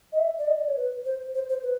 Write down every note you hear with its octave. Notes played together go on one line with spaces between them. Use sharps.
D#5
E5
D5
D#5
D5
C#5
B4
C5
C5
C5
B4